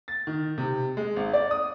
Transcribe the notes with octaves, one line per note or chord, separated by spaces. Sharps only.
A6
D#3
C3
G#3
G#1
D5
D#6